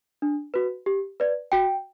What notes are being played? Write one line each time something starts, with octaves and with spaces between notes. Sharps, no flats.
D4
F#4 B4
G4
B4 D5
F#4 G5